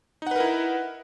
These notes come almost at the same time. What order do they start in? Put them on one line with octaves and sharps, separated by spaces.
D#4 F#5 B4 A#4 E4